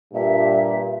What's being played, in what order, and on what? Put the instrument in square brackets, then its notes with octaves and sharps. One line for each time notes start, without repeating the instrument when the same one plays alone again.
[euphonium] G2 [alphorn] A#2 [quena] E5